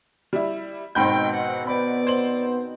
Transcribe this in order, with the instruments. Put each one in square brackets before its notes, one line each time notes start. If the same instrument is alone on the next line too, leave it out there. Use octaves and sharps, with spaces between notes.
[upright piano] G3 E4
[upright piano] G#2 B5 G6 [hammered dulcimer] B2 D#3 C4 [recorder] G5
[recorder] F#5
[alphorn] B3 [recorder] D5 [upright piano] B5
[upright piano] C5 F#7